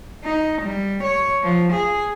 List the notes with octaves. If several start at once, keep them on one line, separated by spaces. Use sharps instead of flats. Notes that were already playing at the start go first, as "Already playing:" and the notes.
D#4
G3
C#5
F3
G#4